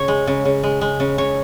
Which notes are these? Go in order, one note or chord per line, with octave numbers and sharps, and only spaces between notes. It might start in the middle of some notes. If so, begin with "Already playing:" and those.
Already playing: C#3 C#5
G#3
C#3
C#3
G#3
G#3
C#3
C#3 C#5